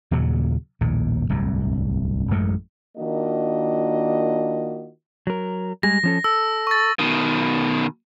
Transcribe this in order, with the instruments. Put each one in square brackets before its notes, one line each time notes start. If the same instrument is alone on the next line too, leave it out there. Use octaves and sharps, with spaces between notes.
[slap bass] D#2 A#2 C#3 F#3
A#1 D#2 A2
D1 C2 G2
A1 F#2 G#3 A3
[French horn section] D#3 A#3 D4 F4 F#4 D#5
[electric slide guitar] F#3 A#4
[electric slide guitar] G3 G#3 G#4 [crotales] A#6
[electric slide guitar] F3 C#4 A4
[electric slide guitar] A4 [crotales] E6
[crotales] C#6 A6
[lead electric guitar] B2 D#3